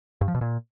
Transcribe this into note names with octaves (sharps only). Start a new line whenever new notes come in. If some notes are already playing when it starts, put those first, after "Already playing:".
G2
F3
B2
A#2